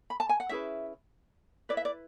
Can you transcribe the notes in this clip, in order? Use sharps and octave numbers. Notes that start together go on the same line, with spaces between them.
B5
A5
G#5
F#5
C#4 E4 G#4 B4 E5
E4 B4 D5
E5
D5